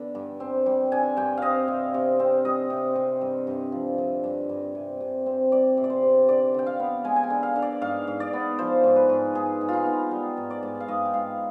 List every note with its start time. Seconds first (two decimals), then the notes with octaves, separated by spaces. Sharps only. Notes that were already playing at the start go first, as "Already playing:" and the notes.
Already playing: D3 B3
0.15 G2
0.40 C4
0.66 G3
0.92 D3 G#5
1.17 G2 G5
1.37 C4 D#5 F5
1.68 C3
1.94 C3
2.20 C4
2.45 G3 D#5
2.70 C3
2.95 C3
3.21 G2
3.47 G2
3.72 F3
3.98 D3
4.24 G2
4.49 G2
4.75 C3
5.01 C3
5.26 C4
5.52 G3 D5
5.77 C3
5.84 D5
5.90 C5
6.03 C3
6.28 D3 D5
6.54 D3 G5
6.66 F5
6.80 B3
7.04 G#3 G#5
7.16 G#5
7.23 G5
7.30 D3
7.43 F5
7.56 D3
7.62 D5
7.81 G#2 F5
8.07 G#2
8.20 D5
8.33 B3
8.59 F3 C5
8.84 G#2
8.96 B4
9.09 G#2
9.35 G#2 G#4
9.61 G#2
9.69 D#4 F4
9.86 B3
10.11 G3
10.37 G#2
10.50 D5
10.63 G#2
10.80 F5
10.88 G#2 D#5
11.05 G5
11.14 G#2 F5